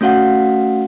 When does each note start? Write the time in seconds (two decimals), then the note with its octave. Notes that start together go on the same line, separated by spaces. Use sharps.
0.01 A3 C#4 F#4 F5 F#5